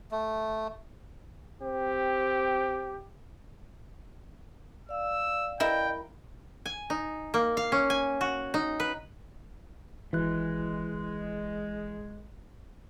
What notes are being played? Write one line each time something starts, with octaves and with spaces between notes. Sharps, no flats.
A3
C4 G4
D5 F5 E6
E4 A#4 D#5 G5
G#5
D#4
A#3
F5
C#4
G#5
F#4
D#4
B4
G#1 E3 G#3 F#6